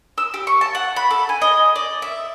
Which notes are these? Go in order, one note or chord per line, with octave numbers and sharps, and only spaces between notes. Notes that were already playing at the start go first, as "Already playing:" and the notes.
E6
G4
C#6
A5
F#5
B5
A4
G#5
D#5
D5
E5